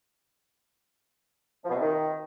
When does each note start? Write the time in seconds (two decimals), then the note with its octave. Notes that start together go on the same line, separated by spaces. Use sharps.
1.64 F3
1.69 B2
1.75 C3
1.80 D#3